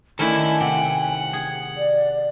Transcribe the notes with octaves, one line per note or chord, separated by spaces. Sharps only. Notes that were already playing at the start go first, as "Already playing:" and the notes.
D#3 A3 C#4 E4 A4 D5 G#5
C3 F#5 G5
G#4
D5